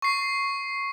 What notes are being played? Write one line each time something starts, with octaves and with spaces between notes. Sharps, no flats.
C#6 C7